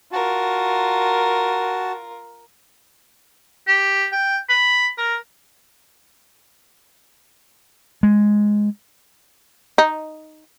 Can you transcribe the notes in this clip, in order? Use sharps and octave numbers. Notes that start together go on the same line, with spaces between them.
F4 F#4 A#4 A5
G4
G5
B5
A#4
G#3
D#4